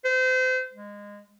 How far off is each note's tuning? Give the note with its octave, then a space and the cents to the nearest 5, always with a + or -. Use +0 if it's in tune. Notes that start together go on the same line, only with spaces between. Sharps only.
C5 -30
G#3 -20